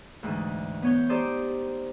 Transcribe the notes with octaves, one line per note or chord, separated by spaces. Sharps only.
D2 G#2 E3
B3 C#5 G6
D#4 G4 A4 C5 D5